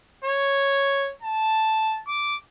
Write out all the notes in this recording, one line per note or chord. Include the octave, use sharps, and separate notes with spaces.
C#5
A5
D6